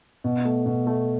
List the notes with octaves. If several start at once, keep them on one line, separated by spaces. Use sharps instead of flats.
B2
A3
B2
A3